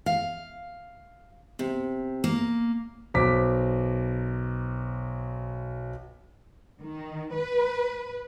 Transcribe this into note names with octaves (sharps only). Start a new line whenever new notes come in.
F5
C3
A#3
B1 C5 D6 B6
D#3
B4